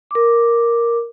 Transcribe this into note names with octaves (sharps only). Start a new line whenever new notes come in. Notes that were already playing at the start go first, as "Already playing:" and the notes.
A#4 D6